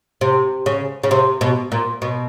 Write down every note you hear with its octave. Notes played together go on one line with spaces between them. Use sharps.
C3
C#3
C#3
C3
B2
A#2
B2